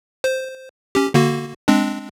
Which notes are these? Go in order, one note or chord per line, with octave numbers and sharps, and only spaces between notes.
C5
C#4 G4
D3 A#3 F#4
G#3 C4 D4